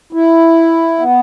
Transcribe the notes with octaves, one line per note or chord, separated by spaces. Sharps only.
E4
B3